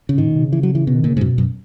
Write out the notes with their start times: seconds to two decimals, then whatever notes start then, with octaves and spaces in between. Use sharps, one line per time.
0.09 C#3
0.18 G#2 D#3
0.26 A#2
0.36 B2
0.44 C#3
0.53 E3
0.63 F#3
0.75 E3
0.87 B2
0.95 D#3
1.04 A#2 C#3
1.17 G#2
1.21 F#2 B2
1.38 F#2